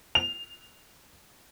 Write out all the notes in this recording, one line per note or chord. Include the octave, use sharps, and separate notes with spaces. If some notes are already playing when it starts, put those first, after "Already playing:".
F7